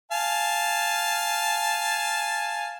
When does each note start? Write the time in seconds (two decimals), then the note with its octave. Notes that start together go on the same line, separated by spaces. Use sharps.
0.11 F5 G#5 A5